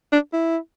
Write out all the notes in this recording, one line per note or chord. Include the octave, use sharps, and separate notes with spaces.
D4
E4